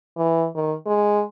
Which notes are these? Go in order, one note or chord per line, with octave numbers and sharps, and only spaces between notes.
E3
D#3
G#3